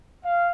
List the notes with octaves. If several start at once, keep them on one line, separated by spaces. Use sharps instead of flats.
F5